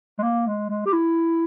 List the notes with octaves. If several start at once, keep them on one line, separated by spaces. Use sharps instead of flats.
G#3
A#3
G#3
G#3
G4
E4